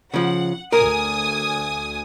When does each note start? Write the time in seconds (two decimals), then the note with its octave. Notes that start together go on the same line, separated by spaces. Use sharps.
0.14 C#3 F3 F#5
0.72 D2 A#4 G#5 D#6